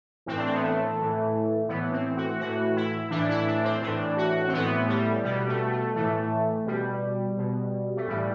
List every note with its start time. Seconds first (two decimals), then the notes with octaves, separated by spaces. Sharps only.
0.26 A2 E3 C4
0.37 D4
0.45 C4
0.54 B3
0.63 A3
0.97 A2 E3
1.68 A2 E3 B3
1.92 C4
2.17 F#4
2.40 A2 E3 F#4
2.76 E4
3.10 A2 E3 D4
3.29 E4
3.47 D4
3.64 C4
3.82 A2 E3 D4
4.17 F#4
4.48 C4
4.53 A2 E3 B3
4.88 G3
5.24 B2 G3
5.48 A3
5.71 A3
5.95 A2 E3 A3
6.66 B2 G3
7.38 B2
7.96 A3
8.08 A2 E3 G3